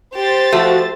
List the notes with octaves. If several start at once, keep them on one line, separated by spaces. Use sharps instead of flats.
G4 C5 A6
F3 A3 F#4